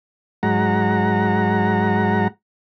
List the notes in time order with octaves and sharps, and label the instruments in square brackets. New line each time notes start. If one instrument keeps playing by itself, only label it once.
[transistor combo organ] G#2 F#3 G#3 F#5 A#5